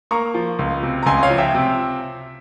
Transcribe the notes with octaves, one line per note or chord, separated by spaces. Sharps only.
A#3 A#5 C#6
F3
C#2
C3
A#5
C#2 G#5 C6
C#5 F5
F3
E5 G5
C3